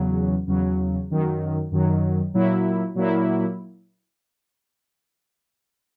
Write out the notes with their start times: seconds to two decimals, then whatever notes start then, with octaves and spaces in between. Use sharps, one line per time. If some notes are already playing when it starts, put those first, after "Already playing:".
Already playing: E2 C#3 F#3
0.47 E2 C#3 F#3
1.10 F#2 D#3 F#3
1.72 F#2 D#3 F#3
2.34 A#2 F#3 A#3 E4
2.95 A#2 F#3 A#3 E4